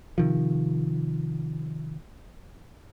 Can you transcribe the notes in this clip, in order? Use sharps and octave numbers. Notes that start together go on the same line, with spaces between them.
C3 D#3 F3